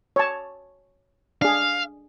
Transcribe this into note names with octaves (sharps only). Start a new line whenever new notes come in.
C#5 A5
D4 G#4 F5